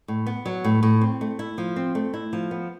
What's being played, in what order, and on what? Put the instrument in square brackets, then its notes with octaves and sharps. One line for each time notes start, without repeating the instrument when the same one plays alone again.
[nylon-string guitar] A2
B3
F#3
A2
A2
C4
A3
E4
F3
C4
A3
E4
F3
B3